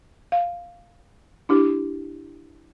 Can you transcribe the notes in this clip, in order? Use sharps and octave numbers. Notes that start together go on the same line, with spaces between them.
F5
D4 E4 G4